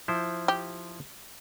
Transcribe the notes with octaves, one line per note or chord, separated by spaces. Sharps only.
F3 E4 C5
G4